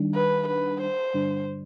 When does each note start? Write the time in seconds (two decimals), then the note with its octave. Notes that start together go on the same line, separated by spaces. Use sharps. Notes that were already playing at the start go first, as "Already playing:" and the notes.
Already playing: D#3 G3 D4
0.14 B4
0.48 B4
0.81 C5
1.14 G2 D3 G3 D4